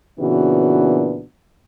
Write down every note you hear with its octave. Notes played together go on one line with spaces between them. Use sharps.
A#2 C#3 E3 B3 D4 F#4